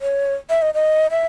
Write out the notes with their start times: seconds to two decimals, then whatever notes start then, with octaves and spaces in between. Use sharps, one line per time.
0.01 C#5
0.50 E5
0.62 D#5
0.74 D#5
1.11 E5